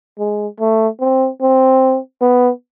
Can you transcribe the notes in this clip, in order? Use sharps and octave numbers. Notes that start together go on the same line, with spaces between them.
G#3
A3
C4
C4
B3